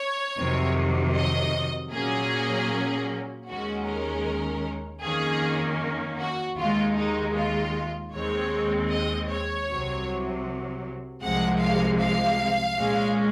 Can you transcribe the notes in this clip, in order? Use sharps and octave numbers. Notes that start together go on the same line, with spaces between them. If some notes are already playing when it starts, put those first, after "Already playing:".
Already playing: C#5
F2 C3 D#3 F#3
D#5
A#2 F#3 A#3 C#4 G#4
D#2 D#3 G#3 C#4 F#4
A#4
F2 D#3 A#3 C#4 G#4
F#4
D#2 D#3 G#3 F4
D#4
F4
D#2 D#3 G#3 C4 C#5
D#5
C#5
C2 C3 F#3
C2 C3 F3 G#3 F#5
F5
F5
A#2 G#3 C#4